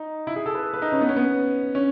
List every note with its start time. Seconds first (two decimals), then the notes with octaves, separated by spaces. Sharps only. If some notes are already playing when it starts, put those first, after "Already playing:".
Already playing: D#4
0.27 E4
0.36 G#4
0.46 A4
0.55 B4
0.74 B4
0.82 D#4
0.92 C#4
1.01 B3
1.09 C#4
1.16 B3
1.75 C#4